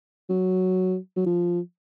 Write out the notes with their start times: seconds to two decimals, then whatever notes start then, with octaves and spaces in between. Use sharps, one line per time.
0.29 F#3
1.16 F#3
1.26 F3